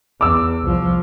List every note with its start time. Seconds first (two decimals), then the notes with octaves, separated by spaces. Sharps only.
0.21 E2 D6 E6
0.62 C2 F3